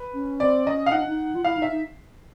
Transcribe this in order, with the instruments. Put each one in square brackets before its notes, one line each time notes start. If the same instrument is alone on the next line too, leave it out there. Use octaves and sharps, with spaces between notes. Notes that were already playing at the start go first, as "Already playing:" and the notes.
Already playing: [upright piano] B4
[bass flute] C#4
[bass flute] C4 [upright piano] D5
[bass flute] C#4 [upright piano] D#5
[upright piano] F5
[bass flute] D#4 [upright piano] F#5
[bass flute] D4
D#4
F4
[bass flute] E4 [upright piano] F5
[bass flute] D#4
[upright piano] E5
[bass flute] D#4